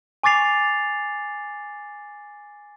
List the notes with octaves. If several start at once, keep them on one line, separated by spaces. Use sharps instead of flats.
G#5 C#6 D6 A6 C7 F7